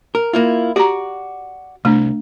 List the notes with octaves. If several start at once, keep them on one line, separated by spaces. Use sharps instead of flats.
A#4
A#3 E4 F4
F#4 G4 D5 A#5
C2 A3 D4